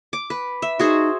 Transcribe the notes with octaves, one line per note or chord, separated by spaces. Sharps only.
D6
B4
E5
D#4 F#4 G#4 C5